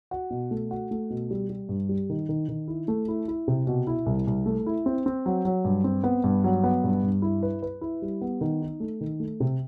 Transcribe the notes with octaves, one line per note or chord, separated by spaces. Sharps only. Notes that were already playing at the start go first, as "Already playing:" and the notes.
F#4
B2
A3
F#4
A3
B2
G3
G3
G2
G3
D#3
D#3
D#3
E4
A3
E4
E4
C3
B2
E4
C2
C2
A3
E4
C4
C4
F#3
F#3
G2
C4
B3
G2
F#3
B3
G2
G2
E4
B4
B4
E4
G3
B3
D#3
D#4
A3
D#3
A3
C3